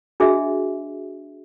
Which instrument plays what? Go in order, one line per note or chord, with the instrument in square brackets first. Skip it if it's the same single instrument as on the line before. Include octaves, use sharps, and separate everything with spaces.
[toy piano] D4 F#4 G#4 D#5 E5